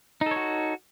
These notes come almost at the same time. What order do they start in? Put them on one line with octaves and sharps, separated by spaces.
D#4 A4 C#5 F#4